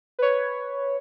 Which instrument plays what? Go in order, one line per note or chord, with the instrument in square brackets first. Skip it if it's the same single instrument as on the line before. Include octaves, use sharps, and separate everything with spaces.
[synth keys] B4 C#5